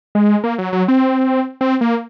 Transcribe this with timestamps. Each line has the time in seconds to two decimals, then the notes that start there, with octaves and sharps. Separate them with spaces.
0.15 G#3
0.44 A#3
0.58 F#3
0.73 F#3
0.88 C4
1.61 C4
1.81 A#3